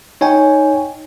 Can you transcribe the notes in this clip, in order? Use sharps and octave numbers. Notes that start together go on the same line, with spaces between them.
D#4 C#5 G5 G#5